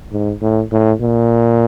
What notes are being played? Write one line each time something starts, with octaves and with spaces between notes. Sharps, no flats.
G#2
A2
A2
A#2